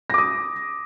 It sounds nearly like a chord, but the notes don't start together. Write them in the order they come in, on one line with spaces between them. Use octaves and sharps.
A#6 D6 D#6